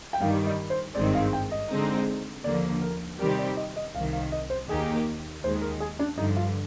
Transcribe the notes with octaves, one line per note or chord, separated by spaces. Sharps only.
G5
G2 D#3 G3 F5
D#5
C5
G#1 G2 D#3 G#3 C4 D5
F5
G5
D#5
D3 G#3 C4 D#4
D#2 D3 F3 A#3 D5
A#4
C3 D#3 G3 C4 G4 A#4
D5
D#5
D#5
C2 C3 D#3 F5
F5
D#5
C5
D#2 D#3 A#3 D#4 G4 G#4
D#2 D#3 G#3 C5
A#4
G#4
D4
G2 D3 F3 D#4
F4